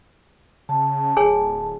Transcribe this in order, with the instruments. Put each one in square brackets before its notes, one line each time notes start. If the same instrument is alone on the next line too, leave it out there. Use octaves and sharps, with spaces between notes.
[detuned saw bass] C#3 [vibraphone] A5
[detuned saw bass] D1 [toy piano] G#4 C#5 G#5